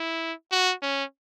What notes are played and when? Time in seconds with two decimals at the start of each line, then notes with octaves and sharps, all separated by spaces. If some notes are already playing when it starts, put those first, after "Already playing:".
Already playing: E4
0.52 F#4
0.82 C#4